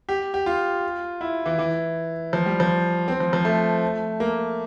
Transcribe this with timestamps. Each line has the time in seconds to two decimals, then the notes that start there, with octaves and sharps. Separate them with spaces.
0.09 G4
0.34 G4
0.46 F4
1.21 E4
1.46 E3
1.59 E3
2.33 F3
2.46 G3
2.60 F3
3.08 C4
3.20 F3
3.33 F3
3.45 A3
4.20 A#3